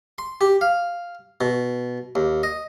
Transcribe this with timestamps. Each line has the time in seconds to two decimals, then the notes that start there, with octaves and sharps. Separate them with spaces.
0.18 C6
0.41 G4
0.61 F5
1.41 B2
2.15 D#2
2.43 D#5